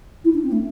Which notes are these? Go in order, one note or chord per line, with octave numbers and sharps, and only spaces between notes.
E4
D4
C4
A3